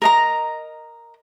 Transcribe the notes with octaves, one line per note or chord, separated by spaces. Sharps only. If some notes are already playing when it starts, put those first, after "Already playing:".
A#4 D#5 A#5